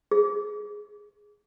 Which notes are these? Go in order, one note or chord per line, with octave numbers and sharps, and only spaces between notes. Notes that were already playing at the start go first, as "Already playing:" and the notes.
G#4